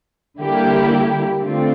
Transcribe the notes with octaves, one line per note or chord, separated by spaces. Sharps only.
D3 G3 A#3 E4 G4
D3 A3 C4 F4